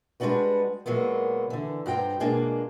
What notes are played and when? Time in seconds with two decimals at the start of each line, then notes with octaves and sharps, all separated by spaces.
0.20 G3 G#3 C4 D4 F#4 B4
0.86 A#2 F#3 G#3 A#3 B3
1.50 D3 E3
1.86 G2 F#4 C5 G5 A#5
2.20 B2 G#3 A#3 D4 F4 G#4